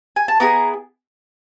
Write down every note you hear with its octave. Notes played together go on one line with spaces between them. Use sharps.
G#5
A5
B3 E4 G#4 A#5